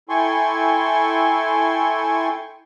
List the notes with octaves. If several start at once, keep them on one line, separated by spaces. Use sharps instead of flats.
E4 A4 G5 G#5 C6 C#6